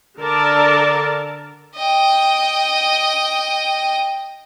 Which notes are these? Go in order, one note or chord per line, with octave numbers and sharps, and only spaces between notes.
D3 A4 A#4 D5 A5
D#5 G5